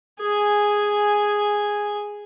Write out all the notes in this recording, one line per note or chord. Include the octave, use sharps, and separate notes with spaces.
G#4 G#5